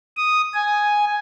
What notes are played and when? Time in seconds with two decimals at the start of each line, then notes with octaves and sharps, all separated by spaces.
0.17 D#6
0.54 G#5